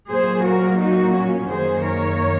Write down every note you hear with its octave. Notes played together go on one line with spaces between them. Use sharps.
A#2 F#3 A#3 G#4 C5
F#4 A#4
D#4 F#4
C#4
F#2 D#3 A#3 G#4 C5
A#4 C#5